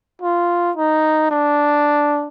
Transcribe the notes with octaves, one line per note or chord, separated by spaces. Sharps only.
F4
D#4
D4